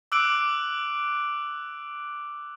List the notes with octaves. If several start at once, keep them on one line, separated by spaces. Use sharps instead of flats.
D6 E6 F#6 D7 F#7